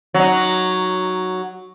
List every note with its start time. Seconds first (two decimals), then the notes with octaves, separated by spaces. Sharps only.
0.14 F#3 D#4